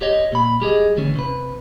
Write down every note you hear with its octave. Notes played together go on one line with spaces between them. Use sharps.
G4 C#5 D#5
A#2 B5
G3 G4 G#4 D#5
D2 E3 C#4
C3 B4